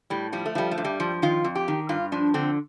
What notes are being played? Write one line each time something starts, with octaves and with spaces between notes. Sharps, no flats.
A2 G3
F3 G3
A3
F3 G3
A3
G2
G3
F3
D#3 F4
F2
G4
D#3
G2 F4
F3 D4
D3 C4